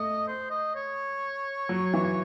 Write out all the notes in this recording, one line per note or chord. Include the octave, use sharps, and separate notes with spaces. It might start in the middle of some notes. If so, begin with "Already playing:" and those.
Already playing: A3 D#5
C5
D#5
C#5
F#3
E3